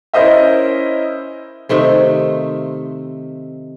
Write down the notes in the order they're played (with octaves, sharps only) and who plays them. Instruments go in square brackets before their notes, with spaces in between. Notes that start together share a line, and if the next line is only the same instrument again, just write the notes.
[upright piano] C#4 E4 A#4 C5 D#5 E5
[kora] C3 D#3 A3 C4